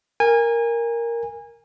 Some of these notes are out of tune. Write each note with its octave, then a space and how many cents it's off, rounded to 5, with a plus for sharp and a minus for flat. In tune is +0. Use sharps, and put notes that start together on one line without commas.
A#4 +0 G#5 -25